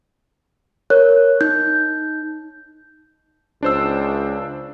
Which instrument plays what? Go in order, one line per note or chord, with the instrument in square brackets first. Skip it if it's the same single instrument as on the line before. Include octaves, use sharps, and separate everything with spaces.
[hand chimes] A#4 C#5 F#6
D#4 G6
[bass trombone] C#2 [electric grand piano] D4 C5 E6